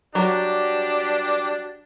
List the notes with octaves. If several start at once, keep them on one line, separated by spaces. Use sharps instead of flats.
F#3 D4 G4